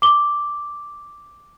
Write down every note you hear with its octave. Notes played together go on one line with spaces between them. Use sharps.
D6 G7